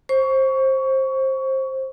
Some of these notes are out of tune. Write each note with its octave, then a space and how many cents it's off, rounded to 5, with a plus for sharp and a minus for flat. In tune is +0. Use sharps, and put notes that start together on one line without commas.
C5 +20 C#6 +20